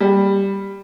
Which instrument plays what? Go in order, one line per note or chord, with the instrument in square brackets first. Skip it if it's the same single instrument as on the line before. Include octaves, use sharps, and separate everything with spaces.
[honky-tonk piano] G3